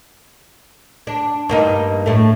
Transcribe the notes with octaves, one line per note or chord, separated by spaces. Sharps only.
D4
G2 A#3 D#4
A2 A3